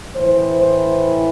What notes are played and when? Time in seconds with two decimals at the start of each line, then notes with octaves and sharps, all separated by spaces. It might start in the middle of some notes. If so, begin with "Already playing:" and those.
0.15 A2 E3 C5
0.59 C5